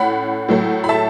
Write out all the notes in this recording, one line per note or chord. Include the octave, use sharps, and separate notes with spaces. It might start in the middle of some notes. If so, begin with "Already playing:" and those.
Already playing: A2 A3 C#4 F#5 B5
A2 F#3 A3
B5
E5 A5